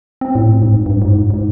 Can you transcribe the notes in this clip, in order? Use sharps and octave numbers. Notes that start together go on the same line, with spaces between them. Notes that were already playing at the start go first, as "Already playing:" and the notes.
C4
A2
G#2
G2
G#2
G#2